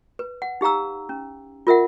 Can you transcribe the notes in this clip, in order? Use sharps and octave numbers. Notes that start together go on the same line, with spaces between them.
B4
F#5
D#4 G4 F5 A#5 E6
C#4
F4 A#4 E5 F#5